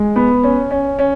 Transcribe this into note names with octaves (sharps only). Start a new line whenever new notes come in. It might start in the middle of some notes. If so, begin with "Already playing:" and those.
Already playing: G#3
B3
C#4
C#4
C#4